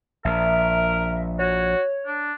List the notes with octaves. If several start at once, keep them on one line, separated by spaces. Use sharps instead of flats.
A#1 A#4 E5
F#4 C#5
D4